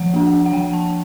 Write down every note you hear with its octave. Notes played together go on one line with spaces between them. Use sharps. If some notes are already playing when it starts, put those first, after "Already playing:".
Already playing: F3 F#5
A#3 D4
F#5
F3 G5
A5